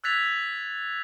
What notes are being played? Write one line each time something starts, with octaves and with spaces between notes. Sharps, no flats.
E6 F#6 G#6 A6 B6 F7